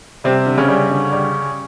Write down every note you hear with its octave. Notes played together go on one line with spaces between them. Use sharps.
C3 G3 C4
D3
C#3 C#4
G3
D3
G3